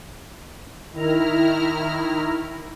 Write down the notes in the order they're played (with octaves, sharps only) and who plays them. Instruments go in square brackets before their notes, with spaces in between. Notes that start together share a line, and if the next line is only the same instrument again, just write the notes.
[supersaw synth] D#3 E4 A#5 F6